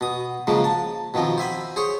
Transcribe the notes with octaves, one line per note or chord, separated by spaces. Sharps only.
B2 D#6
C#3 F3 G#3 A#3
A5
B2 D#3 F3 C4
C5 E5 G#5 B5
G#4 C5 C#5